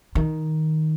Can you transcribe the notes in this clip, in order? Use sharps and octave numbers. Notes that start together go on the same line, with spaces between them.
D#3